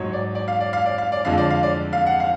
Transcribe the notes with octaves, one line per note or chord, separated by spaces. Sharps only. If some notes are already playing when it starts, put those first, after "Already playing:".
Already playing: G#2 F#3 C#5
D5
D5
F5
D5
F5
D5
F5
D5
F2 D3 F3 G#3 F5
D5
F5
D5
F5
F#5
F5